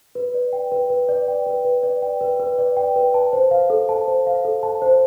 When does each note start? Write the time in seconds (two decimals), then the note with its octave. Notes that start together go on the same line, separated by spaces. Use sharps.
0.15 B4
0.34 D5
0.53 G5
0.72 B4
0.90 B4
1.09 D5
1.28 G5
1.46 B4
1.65 B4
1.83 D5
2.02 G5
2.21 B4
2.40 B4
2.58 D5
2.77 G5
2.96 B4
3.14 A5
3.33 C5
3.51 F5
3.70 A4
3.89 A5
4.08 C5
4.27 F5
4.45 A4
4.63 A5
4.82 C5